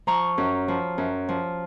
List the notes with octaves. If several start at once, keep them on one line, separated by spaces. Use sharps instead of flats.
F3 A#5 C#6
F#2
F3
F#2
F3